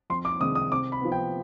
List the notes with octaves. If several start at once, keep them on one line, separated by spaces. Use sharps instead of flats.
F2 C6
D6
C3 D#3 G#3 D4 D#6
D#6
C3 D6
B5
F3 B3
G5